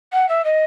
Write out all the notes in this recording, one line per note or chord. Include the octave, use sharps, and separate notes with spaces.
F#5
E5
D#5